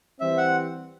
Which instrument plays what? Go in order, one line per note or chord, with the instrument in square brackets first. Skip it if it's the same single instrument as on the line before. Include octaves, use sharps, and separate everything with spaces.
[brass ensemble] E3 G3 C4 [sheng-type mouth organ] E5
[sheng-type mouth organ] F#5